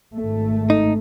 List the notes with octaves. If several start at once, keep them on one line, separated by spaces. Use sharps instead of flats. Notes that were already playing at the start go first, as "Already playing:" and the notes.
G#1 A3
D#4